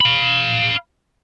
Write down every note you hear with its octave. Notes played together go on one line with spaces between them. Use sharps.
F5 B5